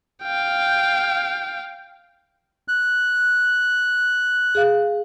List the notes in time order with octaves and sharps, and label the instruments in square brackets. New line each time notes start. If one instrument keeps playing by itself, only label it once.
[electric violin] F5 G5
[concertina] F#6
[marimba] G#4 F5